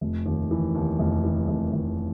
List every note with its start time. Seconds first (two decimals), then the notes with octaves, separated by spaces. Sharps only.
0.01 F1
0.26 D#2
0.51 E3
0.75 D#2
0.99 F1
1.24 E3
1.48 F1
1.73 F1